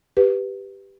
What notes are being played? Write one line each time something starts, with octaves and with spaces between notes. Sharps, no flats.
G4 B4